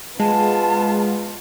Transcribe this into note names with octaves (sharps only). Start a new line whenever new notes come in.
G#3 B3 F4 A5